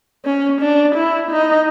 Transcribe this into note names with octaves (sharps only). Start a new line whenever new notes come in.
C#4
D4
E4
D#4